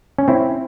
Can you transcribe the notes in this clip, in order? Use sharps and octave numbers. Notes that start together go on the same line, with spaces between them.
C#4
C4 E4